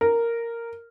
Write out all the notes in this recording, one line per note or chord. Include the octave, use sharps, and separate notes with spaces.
A#4